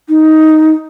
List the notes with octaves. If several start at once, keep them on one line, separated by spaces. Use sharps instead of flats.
D#4